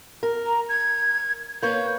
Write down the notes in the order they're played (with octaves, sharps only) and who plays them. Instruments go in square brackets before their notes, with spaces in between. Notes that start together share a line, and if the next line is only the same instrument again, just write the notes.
[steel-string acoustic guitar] A#4
[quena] A#5
G#6
[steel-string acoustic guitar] A#3 B4 C#5 [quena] G6